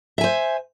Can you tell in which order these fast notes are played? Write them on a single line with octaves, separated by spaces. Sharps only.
E5 G#5 C5